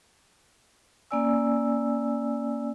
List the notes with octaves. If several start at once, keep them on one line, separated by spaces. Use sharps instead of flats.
A#3 C#4 D5 G#5 E6